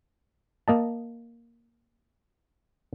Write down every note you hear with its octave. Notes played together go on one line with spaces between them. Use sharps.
A#3 D#5 A5